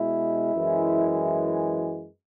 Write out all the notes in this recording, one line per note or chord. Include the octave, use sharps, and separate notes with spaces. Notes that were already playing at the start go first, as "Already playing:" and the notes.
Already playing: B2 G#3 E4
F#2 E3 G#3